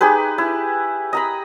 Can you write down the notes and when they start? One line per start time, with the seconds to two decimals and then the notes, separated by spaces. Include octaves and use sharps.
0.01 D#4 G4 G#4 B4
0.38 E4
1.13 D#5 A#5 B5